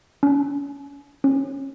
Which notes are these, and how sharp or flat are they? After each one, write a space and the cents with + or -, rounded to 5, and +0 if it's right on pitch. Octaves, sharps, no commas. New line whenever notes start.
C#4 +30
C#4 -15